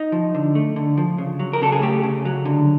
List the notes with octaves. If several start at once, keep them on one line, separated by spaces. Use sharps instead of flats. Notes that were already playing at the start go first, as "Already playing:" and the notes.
Already playing: D#4
F3
D3
A3
D3
F3
C#3
F#3
A#4
C#3 A4
G#4
A3 G4
C#3
F#3
D3